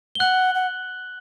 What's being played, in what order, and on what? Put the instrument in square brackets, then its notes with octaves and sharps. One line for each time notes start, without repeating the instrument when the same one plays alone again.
[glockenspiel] G7
[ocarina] F#5 [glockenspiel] F#6 F#7
[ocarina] F#5